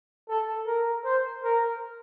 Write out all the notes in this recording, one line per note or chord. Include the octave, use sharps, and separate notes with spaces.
A4
A#4
C5
A#4